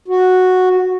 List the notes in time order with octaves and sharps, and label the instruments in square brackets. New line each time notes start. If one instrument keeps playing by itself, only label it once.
[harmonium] F#4